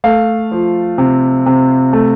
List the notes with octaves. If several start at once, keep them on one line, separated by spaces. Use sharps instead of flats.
A3 F5
F3
C3
C3
A3